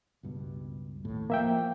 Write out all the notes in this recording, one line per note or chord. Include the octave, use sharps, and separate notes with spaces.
C#2 G2 B2
A#1 D#2 A2
F3 A#3 E5 G5